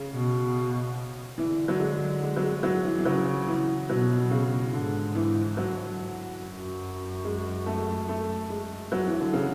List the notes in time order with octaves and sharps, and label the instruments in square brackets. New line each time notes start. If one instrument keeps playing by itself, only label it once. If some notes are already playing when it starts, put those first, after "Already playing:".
Already playing: [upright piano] C#3
[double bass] B2
[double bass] D3 [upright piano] E3
[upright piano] F#3
G#3
G#3
F#3
G#3
F#3
E3
E3
[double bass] C#3 [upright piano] F#3
[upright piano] E3
[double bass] B2 [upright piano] F#3
[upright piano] C#3
[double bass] G#2 [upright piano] D3
[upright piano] E3
F#3
[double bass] F#2
[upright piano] G#3
A3
A3
G#3
F#3
E3
D3
C#3